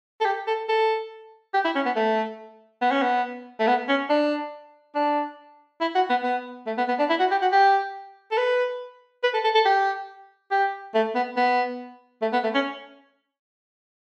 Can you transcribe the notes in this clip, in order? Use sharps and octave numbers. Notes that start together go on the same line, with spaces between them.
A4
G4
A4
A4
G4
E4
C#4
B3
A3
B3
C#4
B3
A3
B3
C#4
D4
D4
E4
F#4
B3
B3
A3
B3
B3
D4
E4
F#4
G4
F#4
G4
A4
B4
B4
A4
A4
A4
G4
G4
A3
B3
B3
A3
B3
A3
C#4